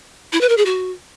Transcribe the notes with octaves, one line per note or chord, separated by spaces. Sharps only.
E4
B4
A#4
G#4
F#4